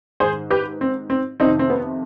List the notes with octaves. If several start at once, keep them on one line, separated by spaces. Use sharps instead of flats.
G#2 D#3 G#4 C5
G4 B4
C4
C4
F2 C3 D#3 C4 D#4
C4
B3